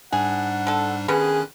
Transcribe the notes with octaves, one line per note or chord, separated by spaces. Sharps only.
G#2 G3 D4 G#4 F#5
D3 A4
D3 D#3 G3 B3 C#4 G#4 F#6